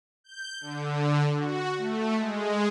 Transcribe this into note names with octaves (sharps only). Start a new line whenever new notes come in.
G6
D3
F#4
A3
G#3